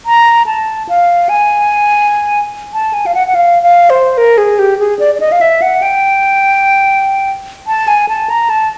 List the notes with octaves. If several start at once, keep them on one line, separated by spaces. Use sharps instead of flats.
A#5
A5
F5
G#5
A5
G#5
F5
F#5
F#5
F5
F5
C5
A#4
G#4
G4
G#4
D5
D5
D#5
F5
E5
F#5
G5
A5
G#5
A5
A#5
A5